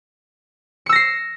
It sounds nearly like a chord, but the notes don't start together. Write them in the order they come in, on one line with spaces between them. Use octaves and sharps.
C#7 E6 A#6 C7